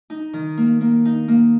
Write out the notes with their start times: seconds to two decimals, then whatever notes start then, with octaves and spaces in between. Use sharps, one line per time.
0.10 D#4
0.33 D#3
0.57 A#3
0.81 A#3
1.05 D#4
1.28 A#3